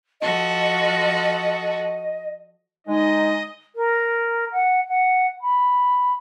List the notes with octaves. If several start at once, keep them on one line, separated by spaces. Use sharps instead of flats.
F3 F#4 A4 D#5
D3 G#3 D#4 D#5 G#5
A#4
F#5
F#5
B5